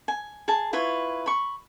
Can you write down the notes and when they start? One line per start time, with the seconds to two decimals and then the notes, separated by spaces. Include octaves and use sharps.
0.08 G#5
0.48 G#4 A5
0.73 E4 F4 B4 C#5
1.26 B5 C#6